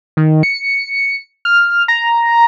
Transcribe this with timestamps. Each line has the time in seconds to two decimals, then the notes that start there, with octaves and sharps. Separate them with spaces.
0.17 D#3
0.43 C#7
1.45 F6
1.88 A#5